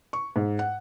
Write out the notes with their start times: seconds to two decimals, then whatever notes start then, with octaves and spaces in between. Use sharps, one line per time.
0.13 C#6
0.36 G#2
0.59 F#5